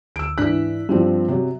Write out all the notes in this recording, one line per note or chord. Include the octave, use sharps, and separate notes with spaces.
D2 E6 D7
G#2 E3 D4 F#6 B6
G2 F3 G3 C4
C3 F#3